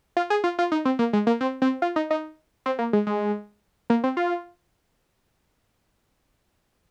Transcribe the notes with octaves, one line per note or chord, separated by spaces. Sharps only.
F4
G#4
F4
F4
D#4
C4
A#3
G#3
A#3
C4
C4
F4
D#4
D#4
C4
A#3
G#3
G#3
A#3
C4
F4